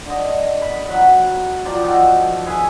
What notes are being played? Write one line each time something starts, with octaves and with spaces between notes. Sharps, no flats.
D3 D#5
B5
F#3 F#5 B5 C#6
F3 D5 G5 A#5
D#3 F3 F#4 A4
G#4 B4 E5 G#5